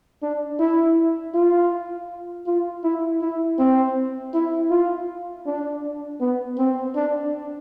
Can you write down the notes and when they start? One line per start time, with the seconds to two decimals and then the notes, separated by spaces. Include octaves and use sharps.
0.23 D4
0.59 E4
1.35 F4
2.47 F4
2.84 E4
3.22 E4
3.59 C4
4.34 E4
4.71 F4
5.47 D4
6.21 B3
6.58 C4
6.95 D4